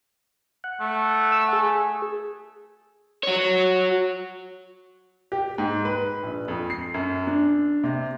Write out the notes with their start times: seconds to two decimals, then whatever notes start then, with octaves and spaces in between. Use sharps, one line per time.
0.64 F#5
0.80 A3
1.32 F#5 E6
1.53 G#4
3.24 F#4 C#5
5.32 G4
5.58 G#2
5.85 B4
6.23 A#1
6.48 F2
6.70 C7
6.94 F#2
7.27 D4
7.84 C3